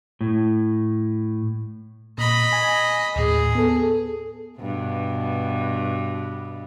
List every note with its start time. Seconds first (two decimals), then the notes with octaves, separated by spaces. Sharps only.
0.21 A2
2.18 A#2 D#5 B5
2.53 G#5
3.16 D#2 A2 G#4
3.55 B3 A4
4.59 G2 B2